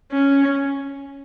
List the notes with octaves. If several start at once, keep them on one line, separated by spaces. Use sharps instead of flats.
C#4